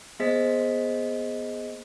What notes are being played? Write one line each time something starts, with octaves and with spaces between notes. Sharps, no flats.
A#3 B3 G#4 C5 D#5 B6